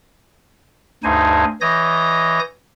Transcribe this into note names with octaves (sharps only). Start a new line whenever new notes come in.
D2 G2 D#4 C5 G#5
E3 C#5 D#5 D#6 G6 A#6